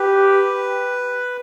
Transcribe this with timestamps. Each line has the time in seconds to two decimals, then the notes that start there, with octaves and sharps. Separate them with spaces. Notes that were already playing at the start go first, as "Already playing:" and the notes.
Already playing: G4 B4